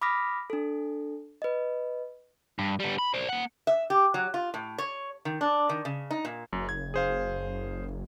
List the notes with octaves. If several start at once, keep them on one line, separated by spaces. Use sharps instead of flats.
B5 D6 D#6 F6 A#6 B6
D4 A4
B4 D#5
G2
G3 B3
B5
C5 D5
A#3 F#5
E5
G4
F#3
F4
A2
C#5
D#3
D4
D#3
C#3
D#4
A#2
F#1 F#2
G#6
G#4 C5 F5